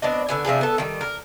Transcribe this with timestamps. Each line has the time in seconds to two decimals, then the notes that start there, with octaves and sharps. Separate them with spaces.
0.02 B3 C4 D4 D#5
0.29 D3 B3 G#5
0.45 C3 F3 D4 G#4
0.61 B3 A4
0.78 D#3 G3
1.01 A#4